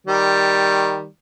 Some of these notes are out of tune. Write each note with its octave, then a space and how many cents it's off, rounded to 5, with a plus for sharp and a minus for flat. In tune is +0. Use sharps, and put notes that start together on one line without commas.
D#3 +0 G3 +0